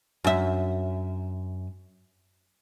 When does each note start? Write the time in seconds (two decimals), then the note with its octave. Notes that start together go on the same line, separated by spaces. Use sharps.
0.24 F#2 E5